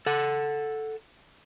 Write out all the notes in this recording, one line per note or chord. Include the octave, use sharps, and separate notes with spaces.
A4 F#5